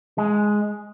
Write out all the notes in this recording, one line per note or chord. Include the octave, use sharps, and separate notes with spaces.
G#3